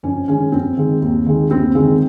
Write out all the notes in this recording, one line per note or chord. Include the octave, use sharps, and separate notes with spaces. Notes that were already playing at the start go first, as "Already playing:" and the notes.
F2 C#4
D#3 G#3 C#4
F2 C4
D#3 G#3
D#2
D#3 G#3
D#2 C4
D#3 G#3 C4